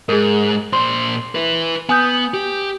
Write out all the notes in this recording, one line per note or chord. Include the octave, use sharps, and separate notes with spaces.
G#2 G#4 A#4
A#2 C5 C6
E4 B4
B3 G#5 D#6 G6
G4